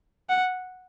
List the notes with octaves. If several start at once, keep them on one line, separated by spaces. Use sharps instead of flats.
F#5